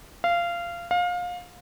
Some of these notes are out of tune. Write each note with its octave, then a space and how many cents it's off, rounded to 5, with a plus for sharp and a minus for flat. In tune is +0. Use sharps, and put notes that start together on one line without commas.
F5 -20
F5 +25